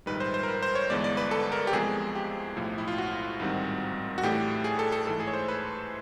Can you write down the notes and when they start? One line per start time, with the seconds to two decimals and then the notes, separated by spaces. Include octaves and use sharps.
0.06 A#1 G#2 D#3 G3 B4
0.20 C5
0.34 C5
0.43 A#4
0.48 B4
0.63 C5
0.75 C#5
0.90 G1 G2 E3 G#3 B3 D5
1.04 D5
1.17 B4
1.31 A4
1.52 A#4
1.67 G4
1.73 E2 C3 F3 G#3 G#4
2.15 G4
2.56 B1 A2 F3 A3
2.78 E4
2.88 F4
2.98 F#4
3.40 A1 G#2 D#3 G3 C4
4.18 F#4
4.23 A2 E3 A3 D4 G4
4.64 G#4
4.79 A4
4.92 A4
5.07 G#2 E3 A3 A4
5.20 G#4
5.27 C#5
5.34 C5
5.48 B4